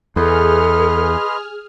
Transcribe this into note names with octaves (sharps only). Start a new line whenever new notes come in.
E2 G#4 A4 B4 D#5 C6 F6